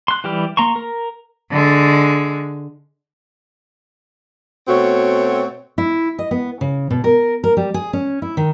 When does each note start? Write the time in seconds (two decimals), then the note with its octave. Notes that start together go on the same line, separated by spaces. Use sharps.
0.08 C6 F#6
0.24 E3 G3 G4 D5 F6
0.57 A#3 A#5 C6 C#6
0.76 A#4
1.50 D3 G#3
4.68 B2 A3 C4 F#4 C#5
5.78 E4
6.19 D#5
6.31 B3
6.61 C#3
6.90 B2
7.04 A#4
7.44 A#4
7.57 G3
7.74 G#4
7.93 C#4
8.22 E4
8.37 D#3